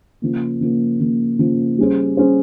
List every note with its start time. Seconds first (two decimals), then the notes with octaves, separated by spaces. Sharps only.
0.22 C#3 F3 A#3
0.61 C#3 F3 A#3
1.00 C#3 F3 A#3
1.39 C#3 F3 A#3
1.79 G3 C#4 G#4 C5
2.17 G3 C#4 G#4 C5